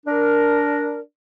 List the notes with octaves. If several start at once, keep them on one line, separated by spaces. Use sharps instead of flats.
D4 A#4